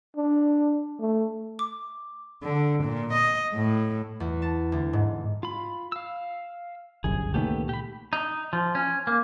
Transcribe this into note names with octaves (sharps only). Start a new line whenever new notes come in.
D4
A3
D6
D3
A#2
D#5
A2
E2
A5
D2
G#2
F4 B5
F5 E6
G1 C2 F#2 G#4
C#2 A#2 D#3 A3 B3 G4
G4 B5
D#4
F3
C#4
A#3